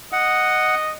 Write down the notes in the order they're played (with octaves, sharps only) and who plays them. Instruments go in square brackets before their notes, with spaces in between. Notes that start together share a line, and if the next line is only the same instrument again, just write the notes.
[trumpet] D#5 [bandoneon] F#5